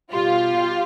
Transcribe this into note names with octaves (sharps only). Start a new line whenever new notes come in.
B2 G3 F4 G4